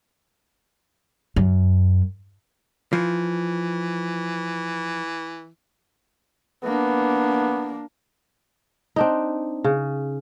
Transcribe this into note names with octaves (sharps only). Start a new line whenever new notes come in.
F#2
E3 F3
A#3 B3 D4
C4 D4 D#4
C#3